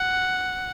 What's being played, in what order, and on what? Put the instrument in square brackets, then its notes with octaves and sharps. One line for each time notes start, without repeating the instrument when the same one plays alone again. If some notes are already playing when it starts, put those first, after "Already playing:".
Already playing: [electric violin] F#5